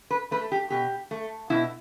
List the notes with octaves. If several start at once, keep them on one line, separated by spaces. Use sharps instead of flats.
B4
A3 B4
G4
B2 G4
A3
B2 E4